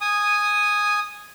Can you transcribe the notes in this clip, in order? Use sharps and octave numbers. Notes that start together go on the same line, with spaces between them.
G#5 D#6